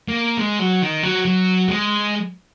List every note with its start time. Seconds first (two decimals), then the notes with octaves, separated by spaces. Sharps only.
0.08 A#3
0.37 G#3
0.59 F#3
0.82 D#3
1.03 F#3
1.25 F#3
1.69 G#3